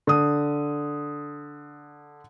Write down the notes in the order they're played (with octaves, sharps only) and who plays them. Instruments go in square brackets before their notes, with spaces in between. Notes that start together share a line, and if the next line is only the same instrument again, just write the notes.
[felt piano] D3 D#6